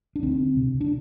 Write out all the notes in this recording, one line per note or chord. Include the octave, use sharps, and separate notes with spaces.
D4
D2 C4
C3
D4